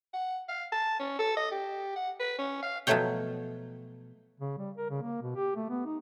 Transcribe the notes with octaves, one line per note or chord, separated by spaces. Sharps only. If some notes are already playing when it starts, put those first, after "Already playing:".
F#5
F5
A5
C#4
A4
D#5
G4
F#5
B4
C#4
F5
B2 F3 F#3 A3 C#5 G5
C#3
G3
A#4
C#3
A#3
B2
G4
A3
B3
D#4